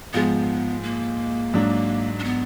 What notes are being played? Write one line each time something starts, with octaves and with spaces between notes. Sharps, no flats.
G#2 F3 G#3 B3
A#3
G#2 F#3 D4
D4
B3